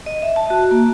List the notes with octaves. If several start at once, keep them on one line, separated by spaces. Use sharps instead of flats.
D#5
E5
A5
F#4
A#3